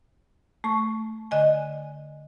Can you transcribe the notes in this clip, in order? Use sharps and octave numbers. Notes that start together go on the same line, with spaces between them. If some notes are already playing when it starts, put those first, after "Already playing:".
A3 C#6
D3 D#5 G#5